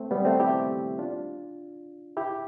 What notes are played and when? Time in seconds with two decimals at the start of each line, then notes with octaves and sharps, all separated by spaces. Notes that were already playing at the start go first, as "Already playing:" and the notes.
Already playing: A3 C4
0.11 G3 B3
0.25 A3 C4
0.40 E4 G4
0.99 D4 F4
2.17 E4 G4